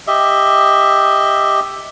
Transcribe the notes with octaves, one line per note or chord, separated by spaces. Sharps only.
G4 D#5 E5